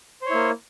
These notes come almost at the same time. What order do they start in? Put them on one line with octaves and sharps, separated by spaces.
C5 C#5 E4 A#3